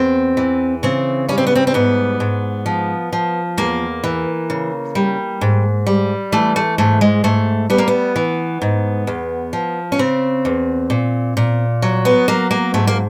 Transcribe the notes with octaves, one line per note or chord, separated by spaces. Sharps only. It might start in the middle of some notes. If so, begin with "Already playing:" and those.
Already playing: E2 C4
E3
C#3 C4
G3 C#4
C4
B3
C4
C4
G#2 B3
G#2
F3
F3
E2 A#3
E3
C#3
G3
G#2
G3
E3 A3
A3
G#2 A3
G#3
G#2 A3
G3 B3
A#3
B3
E3
G#2
E2
F3
C#4
C#3 C4
E2
A#2
A#2
F#3
B3
F#3 A#3
A#3
G#2 A3
A#3